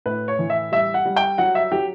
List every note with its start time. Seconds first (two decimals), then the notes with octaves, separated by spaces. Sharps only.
0.06 A2 B4
0.28 C#5
0.39 E3
0.50 E5
0.72 G3 E5
0.94 F#5
1.05 G3
1.16 G5
1.38 F#3 F#5
1.55 E5
1.72 F#3 G4